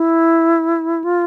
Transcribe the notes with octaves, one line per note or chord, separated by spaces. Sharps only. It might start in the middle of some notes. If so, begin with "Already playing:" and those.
Already playing: E4
F4